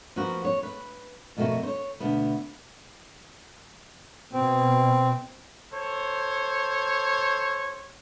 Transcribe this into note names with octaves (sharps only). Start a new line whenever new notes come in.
F3 A#3 B3 F#4
C#5
B4
F2 B2 A3 A#3 F#4
C5 C#5
D2 B2 B3
B2 C4
A4 C5 C#5